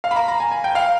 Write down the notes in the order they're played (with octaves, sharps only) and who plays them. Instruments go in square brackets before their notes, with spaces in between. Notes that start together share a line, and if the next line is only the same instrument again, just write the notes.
[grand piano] F5
B5
A#5
A#5
G#5
G#5
G5
F5